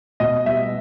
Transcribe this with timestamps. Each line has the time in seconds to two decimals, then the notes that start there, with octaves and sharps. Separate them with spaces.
0.20 B2 D#5
0.46 G3 E5